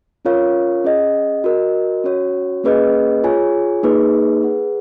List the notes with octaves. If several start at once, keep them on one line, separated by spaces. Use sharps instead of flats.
C#4 F4 A#4 C#5 F5
C#4 G#4 D#5 F#5
F#4 A#4 D#5
C#4 F#4 C#5
A#3 C#4 G#4 B4 D#5
F4 G#4 C#5 G#5
A#3 D#4 G#4 B4
G#4 B4 F#5